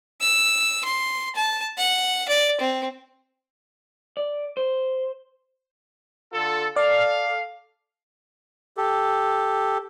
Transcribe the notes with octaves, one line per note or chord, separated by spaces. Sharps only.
E6
C6
A5
F#5
D5
C4
D5
C5
D3 F4 A4
A4 D5 F5
G4 A4